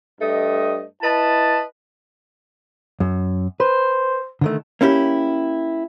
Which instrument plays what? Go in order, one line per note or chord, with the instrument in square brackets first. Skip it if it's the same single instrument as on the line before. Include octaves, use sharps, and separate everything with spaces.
[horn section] G2 A3 D#5
E4 B4 D#5 A5
[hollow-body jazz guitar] F#2
[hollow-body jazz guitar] B4 [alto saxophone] C5
[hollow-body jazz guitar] D3 D#3 A3
A#3 C#4 E4 G4